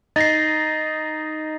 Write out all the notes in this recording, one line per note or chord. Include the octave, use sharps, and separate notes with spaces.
D#4 D#5 A6 A#6 C7